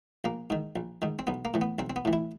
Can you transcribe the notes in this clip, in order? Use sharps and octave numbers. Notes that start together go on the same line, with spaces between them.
A#1 A#3
G#2 D#3
A#1
G#2 D#3
C4
B1 B3
A#3
A2 E3
B3
B1 C4
C4
B3
A2 E3
E4